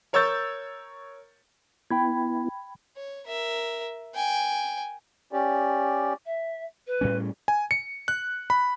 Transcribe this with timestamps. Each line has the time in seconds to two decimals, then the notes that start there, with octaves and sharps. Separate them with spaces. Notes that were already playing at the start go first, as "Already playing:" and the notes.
0.13 A#4 C#5 C#6 E6 G6 A6
1.90 B3 E4 G5 B5 G#6
2.96 C#5
3.27 A#4 E5
4.15 G5 G#5
5.33 C#4 G4 D5
6.25 E5
6.86 B4
7.01 A2 G3 C#4
7.48 G#5
7.71 C#7
8.08 F#6
8.50 B5